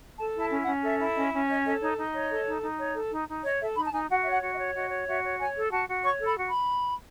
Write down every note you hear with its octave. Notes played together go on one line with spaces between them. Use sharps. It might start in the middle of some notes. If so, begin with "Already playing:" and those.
A4 A5
E4 A5
C#4
F#5
C#4
A4 E5
E4
C#4 D#5
C#4
C#5 D#5
A4 D#5
D#4 C#5
D#4 D#5
C#5
A4
D#4
D#4
C#5
A4
D#4
D#4
C#5 D#5
A4 E5
D#4 B5
A5
D#4 G#5
F#4 F#5
C#5 E5
F#5
F#4
D#5
C#5
F#4 D#5
C#5
F#4 E5
C#5
C#5 G#5
A4
F#4 A5
F#4
C#5 C#6
A4
B5
F#4
B5